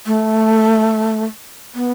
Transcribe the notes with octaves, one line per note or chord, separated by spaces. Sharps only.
A3
B3